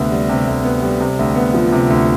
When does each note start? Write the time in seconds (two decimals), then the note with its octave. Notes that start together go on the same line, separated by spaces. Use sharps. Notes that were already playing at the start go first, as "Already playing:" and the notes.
Already playing: D2 C3 B3
0.11 G3
0.29 C3
0.47 D2
0.64 B3
0.82 G3
1.00 C3
1.19 D2
1.36 B3
1.54 F3
1.72 C3
1.90 D2